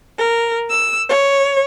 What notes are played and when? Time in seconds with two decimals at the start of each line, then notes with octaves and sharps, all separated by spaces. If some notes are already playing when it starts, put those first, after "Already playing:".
0.19 A#4
0.71 E6
1.09 C#5